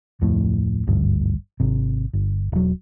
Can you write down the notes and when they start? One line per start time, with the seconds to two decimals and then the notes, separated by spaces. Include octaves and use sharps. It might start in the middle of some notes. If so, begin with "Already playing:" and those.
0.21 D1 F2 A2
0.87 G#1 D2 G2
1.60 G#1 C3
2.13 G1
2.52 E1 F#3